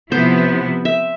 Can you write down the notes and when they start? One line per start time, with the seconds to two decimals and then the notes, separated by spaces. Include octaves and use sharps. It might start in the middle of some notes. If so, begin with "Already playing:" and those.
0.11 C3 F3 B3 E4 C5
0.85 E5